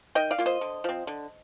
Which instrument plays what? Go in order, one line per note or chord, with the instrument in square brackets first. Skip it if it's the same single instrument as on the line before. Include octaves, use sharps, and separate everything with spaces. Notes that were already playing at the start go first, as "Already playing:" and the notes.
[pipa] D#3 D#5 G5
D5 F5
A#3 F4
C5 D#5
D3
F3 C4
D3